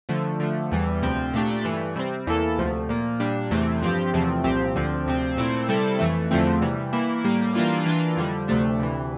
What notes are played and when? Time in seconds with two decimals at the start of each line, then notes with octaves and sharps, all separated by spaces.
0.09 D3 F3 A3
0.40 D3 F3 A3
0.72 E2 E3 G3
1.02 D2 C3 F3 C4
1.33 A#2 A3 D4 G4
1.65 G2 E3 A3
1.96 C3 G3 C4
2.27 E2 E3 A#3 E4 A4
2.58 D2 C3 F3 A3
2.89 A#2 F3 A#3
3.20 A#2 G3 D4
3.51 E2 C3 E3 A3 C4
3.82 G2 F3 C4 G4
4.13 E2 C3 F3 A3 C4
4.44 C2 A#2 F3 C4 G4
4.75 D2 D3 F3 C4
5.07 D2 C3 F3 C4
5.37 A#2 A3 C4 E4
5.68 C3 G3 C4 E4 A4
5.99 F2 E3 A3
6.31 E2 D3 F3 A3 C4
6.62 C3 E3 G3
6.93 E3 A#3 E4
7.24 A2 G3 A#3
7.55 E3 G3 A#3 D4 F4
7.86 E3 A#3 D4 F4
8.17 F2 D3 G3
8.48 D2 C3 F3 A3 D4
8.79 D2 C3 E3